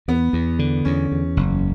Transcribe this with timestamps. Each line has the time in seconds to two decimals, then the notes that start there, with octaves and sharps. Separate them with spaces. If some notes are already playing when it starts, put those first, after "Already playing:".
0.08 E2 B3
0.33 E2
0.59 D3
0.85 E2 C#4
1.12 E2
1.37 F#1